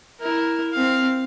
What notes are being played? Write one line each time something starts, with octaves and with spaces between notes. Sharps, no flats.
E4 A#4
C4 F5